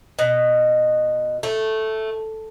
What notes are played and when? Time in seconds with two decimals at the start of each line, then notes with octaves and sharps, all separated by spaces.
0.19 B2
1.43 A3